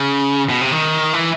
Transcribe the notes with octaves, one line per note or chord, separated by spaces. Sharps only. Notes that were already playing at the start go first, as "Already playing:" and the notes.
Already playing: C#3
B2
C3
D#3
E3